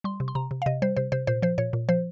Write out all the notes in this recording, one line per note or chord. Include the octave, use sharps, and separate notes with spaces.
G3 C6
C3
C6
C3 A#5
C3
F5
C3 D#5
G3 C5
C3 C5
C3 C5
A#2 C5
F3 C5
A#2 C#5
A#2
F3 C5